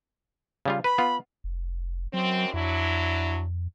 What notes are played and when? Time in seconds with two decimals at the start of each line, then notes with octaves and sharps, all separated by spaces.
0.66 C#3 G3 F4
0.84 B4 B5
0.98 B3 F4
1.44 F1
2.13 F#2 F#3 C4
2.54 F2 F#3 D4 E4